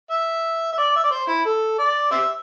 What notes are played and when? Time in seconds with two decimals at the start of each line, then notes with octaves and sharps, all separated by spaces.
0.11 E5
0.73 E5
0.78 D5
0.96 E5
1.04 D5
1.11 C5
1.27 E4
1.45 A4
1.79 D5
2.11 G4 C5 E5